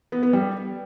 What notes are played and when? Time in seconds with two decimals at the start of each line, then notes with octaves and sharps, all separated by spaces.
0.12 B3
0.23 B3
0.33 G3